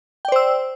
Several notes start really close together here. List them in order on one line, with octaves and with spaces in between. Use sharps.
G5 D5 C5 E6